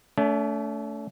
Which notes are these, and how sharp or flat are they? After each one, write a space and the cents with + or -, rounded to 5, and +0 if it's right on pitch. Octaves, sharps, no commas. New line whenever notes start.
A3 +0 C#4 +45